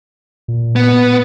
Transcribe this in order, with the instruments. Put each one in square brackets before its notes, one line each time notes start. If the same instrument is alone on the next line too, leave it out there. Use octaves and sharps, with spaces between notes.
[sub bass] A#2
[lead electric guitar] B3